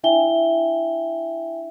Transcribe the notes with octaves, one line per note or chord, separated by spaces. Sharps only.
D4 E4 E5 G5 G#5 G7